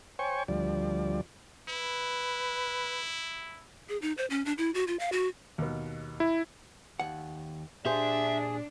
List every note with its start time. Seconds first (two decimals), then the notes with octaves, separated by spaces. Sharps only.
0.19 C5 C#5 G5 G#5 C#6
0.48 D2 F3 G3 D5
1.69 E4 B4
3.89 G#4
4.02 D#4
4.17 C5
4.30 C#4
4.45 D4
4.58 E4
4.74 F#4
4.87 F4
4.99 F5
5.12 F#4
5.58 D#2 B2
6.20 E4
7.00 D#2 F#5
7.85 A#2 D4 G4 G#4 C5 E5